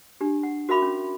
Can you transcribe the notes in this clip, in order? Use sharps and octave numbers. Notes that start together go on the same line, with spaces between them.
D4 G4
F#5
F#4 A#4 E5 F5 B5 D6
C#4